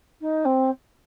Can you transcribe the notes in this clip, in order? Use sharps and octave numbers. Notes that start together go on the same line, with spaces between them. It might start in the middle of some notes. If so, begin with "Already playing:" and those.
D#4
C4